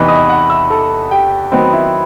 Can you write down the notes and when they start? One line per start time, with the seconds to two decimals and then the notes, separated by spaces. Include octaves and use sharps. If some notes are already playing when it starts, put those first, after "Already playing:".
Already playing: E2 C3 E3 B3 D#4 B4 B5
0.08 D#5 D#6
0.29 F#5 F#6
0.49 E5 E6
0.70 A4 A5
1.11 G4 G5
1.52 D#3 F#3 B3 C4 D#4 C5
1.73 E4 E5